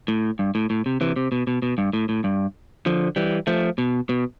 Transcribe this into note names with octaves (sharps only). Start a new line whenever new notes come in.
A2
G2
A2
A2
C3
C3 E3
C3
B2
B2
B2
G2
A2
A2
G2
D3 F3
E3 G3
F3 A3
B2
B2